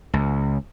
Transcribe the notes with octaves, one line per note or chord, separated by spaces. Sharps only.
C#2